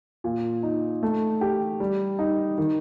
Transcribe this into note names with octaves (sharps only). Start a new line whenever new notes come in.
A#2
D#4
A3
G4
G3
D#4
D#3